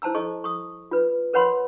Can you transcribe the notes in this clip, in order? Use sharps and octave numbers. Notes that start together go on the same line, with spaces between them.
E4 C5 A5 A#5 E6
A4 D#5 C#6
C#6 D#6
F4 B4
A#4 B4 C#5 F#5 B5 C6